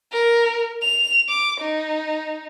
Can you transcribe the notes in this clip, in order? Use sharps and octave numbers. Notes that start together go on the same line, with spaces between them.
A#4
F7
D6
D#4